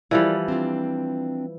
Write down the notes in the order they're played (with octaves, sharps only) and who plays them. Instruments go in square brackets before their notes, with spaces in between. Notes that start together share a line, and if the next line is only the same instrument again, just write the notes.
[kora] E3 F3 G3 [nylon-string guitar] A#4 D5 F5
[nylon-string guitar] C4 D4 F4